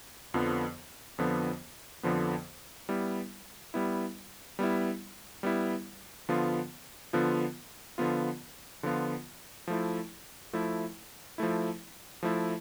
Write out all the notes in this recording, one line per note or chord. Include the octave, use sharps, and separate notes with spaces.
F2 D3 F3 B3
F2 D3 F3 B3
F2 D3 F3 B3
G3 B3 E4
G3 B3 E4
G3 B3 E4
G3 B3 E4
D3 F3 B3 F4
D3 F3 B3 F4
D3 F3 B3 F4
D3 F3 B3 F4
F3 A3 E4
F3 A3 E4
F3 A3 E4
F3 A3 E4